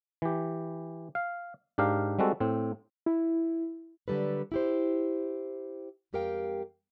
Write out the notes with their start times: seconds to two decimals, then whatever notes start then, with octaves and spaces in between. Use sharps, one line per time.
0.22 E3 G4
1.15 F5
1.78 G#2 D4 G4 A#4 F5
2.19 G3 G#3 C4 F#4 A4
2.40 A2 C4
3.06 E4
4.08 D3 F#3 G3 A4 B4
4.52 E4 G4 C5
6.13 F2 G#3 G4 A#4 F5 G5